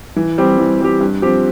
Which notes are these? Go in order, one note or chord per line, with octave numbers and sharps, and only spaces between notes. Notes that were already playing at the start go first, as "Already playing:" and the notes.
E3
G3 C4 G4
E3
G3 C4 G4
G2
F3 C4 G4